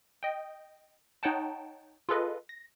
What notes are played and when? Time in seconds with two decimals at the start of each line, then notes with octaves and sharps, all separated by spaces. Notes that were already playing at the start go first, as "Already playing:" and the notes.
0.23 D#5 G5
1.23 D#4 C#5 F#5 G5 A5
2.09 F4 G#4 A4 B4 D#5
2.49 A#6